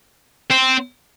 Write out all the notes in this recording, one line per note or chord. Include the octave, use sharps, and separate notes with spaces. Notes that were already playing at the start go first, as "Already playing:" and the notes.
C4